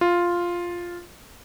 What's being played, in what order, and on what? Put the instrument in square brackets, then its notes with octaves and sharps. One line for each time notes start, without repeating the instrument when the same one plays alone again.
[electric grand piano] F4